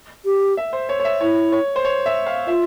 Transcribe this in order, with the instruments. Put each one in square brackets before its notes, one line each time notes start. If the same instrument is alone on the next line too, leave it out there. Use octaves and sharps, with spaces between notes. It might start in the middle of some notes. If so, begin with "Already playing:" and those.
[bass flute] G4
[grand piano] E5
C5
C#5
C#5
E5
[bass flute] E4 [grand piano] C#5
[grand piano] C#5
C5
C#5
E5
F5
[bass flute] F4 [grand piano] E5